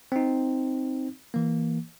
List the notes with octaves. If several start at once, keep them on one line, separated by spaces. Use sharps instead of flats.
C4 D#4
E3 A#3